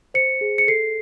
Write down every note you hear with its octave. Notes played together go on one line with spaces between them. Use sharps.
C5 C#7
G#4
C#7
A4 C7